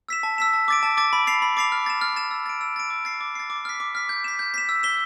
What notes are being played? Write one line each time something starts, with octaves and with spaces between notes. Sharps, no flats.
E6 B6 E7
A5
E6 B6 E7
A5
D6 A6 D7
A5
D6 A6 D7
B5
D6 A6 C7 F7
B5
D6 A6 C7 F7
F6
A6 E7
F6
A6 E7
E6
A6 D7
E6
A6 D7
D6
A6 C7
D6
A6 C7
D6
F6 B6
D6
F6 B6
G6
B6 E7
G6
B6 E7
E6
B6 E7 G7